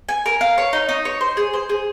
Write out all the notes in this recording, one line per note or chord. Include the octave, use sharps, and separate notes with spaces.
G#5
A#4
F5
C#5
D#4
D#4
C#5
C5
G#4
C5
G#4